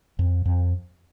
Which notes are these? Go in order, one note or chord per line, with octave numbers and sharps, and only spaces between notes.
F2
F2